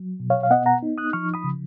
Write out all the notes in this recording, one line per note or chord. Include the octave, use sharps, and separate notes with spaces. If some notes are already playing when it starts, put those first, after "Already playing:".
Already playing: F#3
B2
C#5 F5
F5
B3 D#5 F#5
F#5 A#5
D#4
D#6 F#6
F3 C#6 F6
B5 D#6
C#3